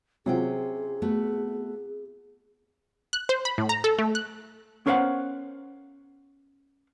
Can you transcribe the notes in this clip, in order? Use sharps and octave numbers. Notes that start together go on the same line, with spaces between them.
C3 F#3 C#4 F4 G#4 C5 G5
A3 B3 F#4
F#6
C5
B5
A2
A#5
A4
A3
F#6
B3 C#4 A#4 C5 F5 F#5